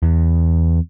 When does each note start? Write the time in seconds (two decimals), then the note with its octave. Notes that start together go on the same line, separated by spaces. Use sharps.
0.03 E2